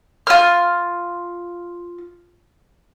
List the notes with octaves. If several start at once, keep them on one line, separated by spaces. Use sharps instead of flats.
F4 F6